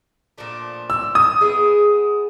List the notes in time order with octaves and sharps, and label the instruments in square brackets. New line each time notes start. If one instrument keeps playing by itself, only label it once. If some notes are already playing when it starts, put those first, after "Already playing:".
[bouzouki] A#2 F3 A3 D4
[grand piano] E6
D#6
[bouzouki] B3 E4 G#4